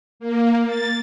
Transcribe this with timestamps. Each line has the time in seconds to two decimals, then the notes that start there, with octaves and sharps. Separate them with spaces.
0.20 A#3
0.67 A6